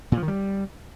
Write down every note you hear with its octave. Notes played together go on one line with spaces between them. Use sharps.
A#2
F3
D#3
G3